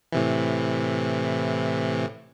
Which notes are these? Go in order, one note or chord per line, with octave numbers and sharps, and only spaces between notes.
A2 C3 E3